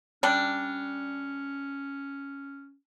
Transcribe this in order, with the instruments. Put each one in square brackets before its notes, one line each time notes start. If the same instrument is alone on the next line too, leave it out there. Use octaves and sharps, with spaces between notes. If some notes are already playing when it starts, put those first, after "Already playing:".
[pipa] G3 D4 [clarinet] C#4